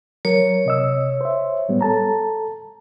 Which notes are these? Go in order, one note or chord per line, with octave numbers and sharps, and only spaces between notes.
F#3 A#4 C#5
C3 D#5 E6
C5 E5
A2 G3 B3
A4 A5 A#5